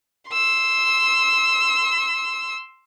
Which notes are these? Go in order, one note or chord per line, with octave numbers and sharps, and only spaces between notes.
C6 E6